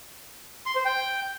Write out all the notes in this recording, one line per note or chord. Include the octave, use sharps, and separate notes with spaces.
C6
C5
G5